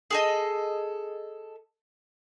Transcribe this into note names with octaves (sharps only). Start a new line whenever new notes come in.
G#4 A4 D#5